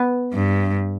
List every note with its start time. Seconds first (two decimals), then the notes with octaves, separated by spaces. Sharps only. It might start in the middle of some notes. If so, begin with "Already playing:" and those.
Already playing: B3
0.33 G2